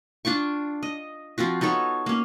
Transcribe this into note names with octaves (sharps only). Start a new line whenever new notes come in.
D4 F4 G5 C#6
D#5
F3 C4 F4 F#4
B3 D#4 A4 C#5
A#3 C#4